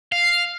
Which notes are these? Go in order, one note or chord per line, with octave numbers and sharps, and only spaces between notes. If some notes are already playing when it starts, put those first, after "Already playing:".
F5